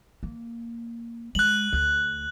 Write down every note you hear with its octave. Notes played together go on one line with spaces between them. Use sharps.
A#3
G#3 F#6 F#7
D2